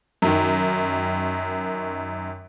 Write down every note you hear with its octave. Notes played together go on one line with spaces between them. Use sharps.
F#2 D#3